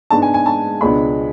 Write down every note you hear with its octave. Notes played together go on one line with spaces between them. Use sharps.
G#2 G#3 B3 D4 A5
G#5
G#5
A5
C#2 B2 G#3 D4 B5